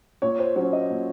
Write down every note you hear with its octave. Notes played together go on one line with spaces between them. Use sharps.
A#2 C#5
C5
F#3 C#4 C#5
D#5
A#2